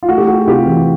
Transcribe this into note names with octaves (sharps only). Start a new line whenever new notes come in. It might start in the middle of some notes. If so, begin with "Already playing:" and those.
F4
A3 F#4
G4
A3 F#4 G#4
C3 F4 G4
E3